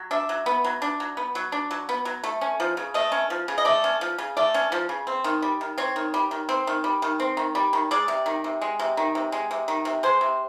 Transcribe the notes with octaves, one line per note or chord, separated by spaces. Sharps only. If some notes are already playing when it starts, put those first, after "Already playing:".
Already playing: F#3
D4 E5
F#3
B3
F#3
D4
F#3
B3
F#3
D4
F#3
B3
F#3
A3
C#4
F3
C#3
A3 D#5
C#4
F3
C#3
D#5
A3 D5
C#4
F3
C#3
A3 D5
C#4
F3
C#3
C4
D#3
G3
D#3
C4 C#5
D#3
G3
D#3
C4
D#3
G3
D#3
C4
D#3
G3
D#3
G#3 D5
C3
D#3
C3
G#3
C3
D#3
C3
G#3
C3
D#3
C3
G#3 C5
C3